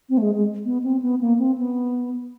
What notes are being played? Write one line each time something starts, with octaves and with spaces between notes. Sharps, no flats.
C4
A3
G#3
G#3
B3
C4
B3
A#3
C4
B3